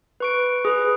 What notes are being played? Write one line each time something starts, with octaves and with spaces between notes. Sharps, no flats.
B4 C#6 D7
G#4 B4